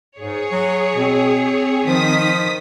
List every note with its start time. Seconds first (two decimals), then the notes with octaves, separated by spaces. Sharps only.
0.20 G#2 G#4 C#5
0.52 F#3
0.95 B2 C4
1.88 D#3 F3 D#6 B6